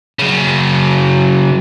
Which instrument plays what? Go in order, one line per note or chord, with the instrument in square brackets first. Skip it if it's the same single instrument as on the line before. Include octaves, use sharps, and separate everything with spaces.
[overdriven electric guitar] C#3 F#3